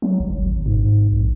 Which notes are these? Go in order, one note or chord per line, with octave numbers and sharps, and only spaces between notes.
F#3
G1
G#1
G#2
A#1